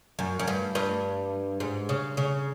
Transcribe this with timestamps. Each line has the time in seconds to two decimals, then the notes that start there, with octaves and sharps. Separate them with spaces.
0.19 F#2
0.40 F#2
0.48 G2
0.75 G2
1.60 G#2
1.89 C#3
2.17 C#3